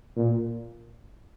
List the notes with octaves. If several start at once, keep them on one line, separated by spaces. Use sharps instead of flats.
A#2